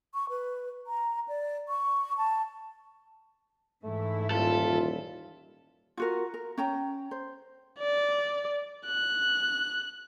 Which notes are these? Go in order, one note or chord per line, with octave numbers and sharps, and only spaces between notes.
C#6
B4
A#5
D5
C#6
A5
G#2 E3 A3 E4
D#1 F4 A4
F4 F#4 A#4
A#4
C#4 G5 A#5
C5
D5
F#6